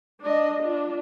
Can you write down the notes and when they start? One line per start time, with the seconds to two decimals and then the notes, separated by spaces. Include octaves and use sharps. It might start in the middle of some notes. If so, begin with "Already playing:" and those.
0.21 D4 D#5
0.63 D4 F4